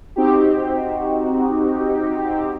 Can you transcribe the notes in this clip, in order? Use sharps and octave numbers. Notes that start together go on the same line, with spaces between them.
C4 D#4 F#4 G4